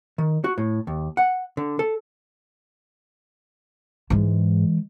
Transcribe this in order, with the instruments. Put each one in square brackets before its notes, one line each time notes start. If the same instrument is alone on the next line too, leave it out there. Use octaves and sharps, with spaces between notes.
[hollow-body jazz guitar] D#3
F#4
A2
D#2
F#5
D3
A4
[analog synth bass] G#2 [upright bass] E3 G#3